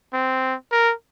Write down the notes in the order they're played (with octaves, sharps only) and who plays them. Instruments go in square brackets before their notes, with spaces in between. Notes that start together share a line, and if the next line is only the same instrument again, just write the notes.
[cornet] C4
A#4